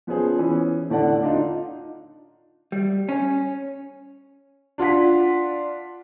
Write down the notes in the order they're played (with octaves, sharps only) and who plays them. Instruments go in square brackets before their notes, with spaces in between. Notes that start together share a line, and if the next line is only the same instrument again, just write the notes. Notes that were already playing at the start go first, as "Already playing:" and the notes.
[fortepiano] F3 B3 C#4 G#4 C5
E3 B3 C#4
A2 D3 D5 F#5
D4 D#4 F4
[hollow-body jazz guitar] G3
C#4
[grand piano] D4 F4 F#5 B6